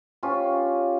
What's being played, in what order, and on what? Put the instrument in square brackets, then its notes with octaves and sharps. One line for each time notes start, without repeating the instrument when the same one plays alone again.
[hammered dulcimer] C#4 F4 G4